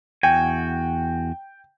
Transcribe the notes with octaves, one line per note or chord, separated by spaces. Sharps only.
E2 F#4 G5 G#5